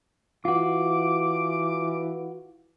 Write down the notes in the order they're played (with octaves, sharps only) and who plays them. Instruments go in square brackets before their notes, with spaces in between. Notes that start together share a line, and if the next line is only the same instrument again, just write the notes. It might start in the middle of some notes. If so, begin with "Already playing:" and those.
[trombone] E3 [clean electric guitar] F4 F#4 [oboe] D6